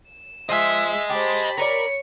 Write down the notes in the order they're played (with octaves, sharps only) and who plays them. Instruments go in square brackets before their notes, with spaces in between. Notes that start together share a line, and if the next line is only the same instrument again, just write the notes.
[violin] E7
[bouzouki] F3 [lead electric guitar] D#5 G#5 [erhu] E5
[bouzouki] G4 [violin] C5 A5 [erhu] B5
[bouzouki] A#4 B4 D5 [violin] C#5 C#7